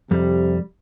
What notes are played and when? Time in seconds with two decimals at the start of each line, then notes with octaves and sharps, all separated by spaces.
0.11 F2 C3 G3